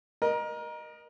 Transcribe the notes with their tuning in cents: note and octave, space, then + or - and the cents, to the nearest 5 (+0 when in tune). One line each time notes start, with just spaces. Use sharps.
A#4 +25 D#5 -20